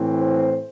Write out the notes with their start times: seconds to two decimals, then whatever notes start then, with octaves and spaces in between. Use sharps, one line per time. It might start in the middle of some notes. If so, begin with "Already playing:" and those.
Already playing: A2 E3 C4
0.20 C5